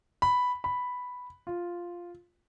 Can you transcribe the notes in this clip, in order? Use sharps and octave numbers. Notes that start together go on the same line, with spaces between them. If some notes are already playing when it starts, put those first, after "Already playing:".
B5
B5
F4